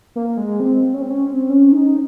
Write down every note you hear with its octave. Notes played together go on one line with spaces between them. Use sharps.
A#3
G#3
C4
C#4
C4
C#4
C4
C#4
D#4